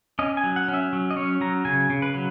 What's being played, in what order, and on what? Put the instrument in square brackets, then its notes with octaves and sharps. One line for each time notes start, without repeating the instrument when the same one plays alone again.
[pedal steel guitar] C#4 D#5
G#5
F#3
F#5
C#4
E5
F#3
D#5
C#4 C#5
F#3 A#5
C#3 G#5
C#3
B4
F#3